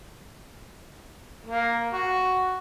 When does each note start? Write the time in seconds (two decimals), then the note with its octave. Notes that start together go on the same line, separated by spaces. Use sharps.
1.46 A#3
1.93 F#4